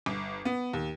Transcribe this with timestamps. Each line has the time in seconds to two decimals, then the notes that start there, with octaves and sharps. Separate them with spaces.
0.06 G1
0.45 B3
0.73 D#2